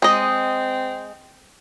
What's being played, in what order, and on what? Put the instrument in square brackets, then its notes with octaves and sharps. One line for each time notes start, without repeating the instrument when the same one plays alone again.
[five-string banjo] G#3 D#5 [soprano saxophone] C4